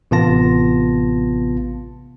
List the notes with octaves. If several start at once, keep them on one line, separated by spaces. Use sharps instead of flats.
A1 C3 B3 F4 A5 A#6